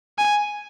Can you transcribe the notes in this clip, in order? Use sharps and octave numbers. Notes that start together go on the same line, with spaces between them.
G#5